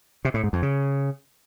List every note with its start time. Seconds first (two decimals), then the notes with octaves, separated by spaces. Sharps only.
0.25 C3
0.34 A2
0.44 G#2
0.53 F2
0.62 C#3